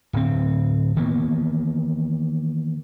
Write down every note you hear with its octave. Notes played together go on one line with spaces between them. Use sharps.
D1 C4
D#3 E3 A#3 B3